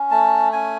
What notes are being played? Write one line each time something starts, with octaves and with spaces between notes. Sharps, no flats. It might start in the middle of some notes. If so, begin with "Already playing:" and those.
Already playing: C#4
A3 A5
C#4 G#5